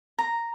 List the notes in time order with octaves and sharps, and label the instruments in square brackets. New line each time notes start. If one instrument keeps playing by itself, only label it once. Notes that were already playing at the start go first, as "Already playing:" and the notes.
[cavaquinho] A#5